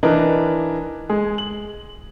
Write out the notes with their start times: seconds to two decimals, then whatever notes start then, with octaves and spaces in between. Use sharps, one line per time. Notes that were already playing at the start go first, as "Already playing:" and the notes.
0.03 E3 D4 D#4 A#4 B4
1.09 G#3 G#4
1.38 F#7